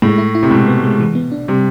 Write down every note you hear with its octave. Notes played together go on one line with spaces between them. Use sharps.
A2 G#3
E4
E4
C3
B2 G#3
B3
G#3
E3
B3
D4
C3 G3